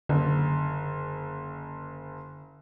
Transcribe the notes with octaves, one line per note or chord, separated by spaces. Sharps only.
F#1 D3